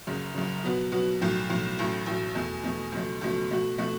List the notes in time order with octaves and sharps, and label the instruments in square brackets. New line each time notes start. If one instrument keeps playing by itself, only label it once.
[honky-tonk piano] F#1 F#2 C#3
F#1 F#2 C#3
B2 F#3 B3 F#4
B2 F#3 B3 F#4
B1 A2 F#3
B1 A2 F#3
A1 A2 F#3
A1 A2 F#3
E2 B2 A3
E2 B2 A3
C#2 B2 F#3 A3
C#2 B2 F#3 A3
B2 A3 F#4
B2 A3 F#4